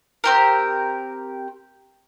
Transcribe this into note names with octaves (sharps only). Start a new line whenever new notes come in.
C4 G4 A#4